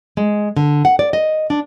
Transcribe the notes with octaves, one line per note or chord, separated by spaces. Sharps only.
G#3
D3
F#5
D5
D#5
D4